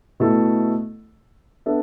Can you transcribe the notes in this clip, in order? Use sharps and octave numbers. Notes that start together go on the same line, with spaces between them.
B2 A3 E4 A4
B3 D4 A4 E5